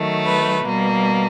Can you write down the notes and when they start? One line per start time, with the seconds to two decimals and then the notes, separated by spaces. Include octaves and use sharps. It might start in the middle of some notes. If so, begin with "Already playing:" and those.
Already playing: D#3 F#3 A3
0.25 B4
0.65 B2 G3 A#3